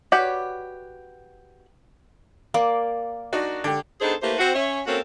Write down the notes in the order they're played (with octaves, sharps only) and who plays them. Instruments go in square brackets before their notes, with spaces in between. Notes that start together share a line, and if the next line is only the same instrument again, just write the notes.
[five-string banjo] F#4 G4 B4 C#5 D5
[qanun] A#3 D5
[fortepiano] D4 D#4 F#4
D3 G4
[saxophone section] B3 D4 D#4 G#4 A4 C5
A3 A#3 E4 G4 B4 C5
C4 F#4
C#4 C#5 E5
A#3 C4 C#4 F#4 A4 A#4